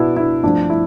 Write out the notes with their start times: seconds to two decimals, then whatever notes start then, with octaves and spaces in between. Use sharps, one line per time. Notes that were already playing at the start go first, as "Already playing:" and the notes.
Already playing: B2 B3 D4 E4
0.17 E4
0.43 G2 F3 A3 C4 D4
0.70 E4